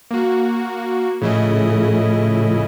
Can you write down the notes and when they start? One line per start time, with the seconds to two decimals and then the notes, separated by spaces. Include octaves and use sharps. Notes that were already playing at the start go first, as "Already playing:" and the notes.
0.11 A#3 F#4
1.21 A2 C#3 F3 A3 E4 D#5